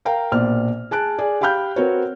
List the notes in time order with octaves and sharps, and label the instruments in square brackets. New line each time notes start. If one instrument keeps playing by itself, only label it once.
[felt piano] A#4 F5 G5 A#5
A#1 B2 C5 D5 F6
G#4 A5 F#6 D7
G#4 D5
G4 F5 G5 B5 F6 G6
C4 F#4 A#4 B4 C#5